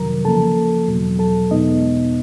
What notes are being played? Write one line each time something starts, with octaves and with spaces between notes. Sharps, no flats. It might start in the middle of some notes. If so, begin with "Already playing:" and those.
Already playing: F2 C3 D#3 F#3 A#4 A#5
C#3 F3 A#3 A4 A5
E2 B2 F#3
A4 A5
E2 B2 G#3 B3 D#4 D#5